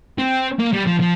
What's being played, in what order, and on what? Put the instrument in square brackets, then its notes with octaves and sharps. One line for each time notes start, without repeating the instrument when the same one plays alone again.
[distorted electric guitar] C4
A#3
G3
F3
F3